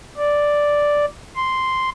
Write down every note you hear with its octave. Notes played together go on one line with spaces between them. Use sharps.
D5
C6